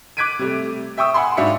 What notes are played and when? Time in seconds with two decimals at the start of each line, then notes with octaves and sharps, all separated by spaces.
0.17 D6 F#6 G#6 B6 D7 D#7
0.39 C3 G3 A3
0.98 E5 G5 C#6 D#6 E6
1.14 F#5 G#5 B5 C6
1.37 G#2 D4 F#4 E5 F5 C#7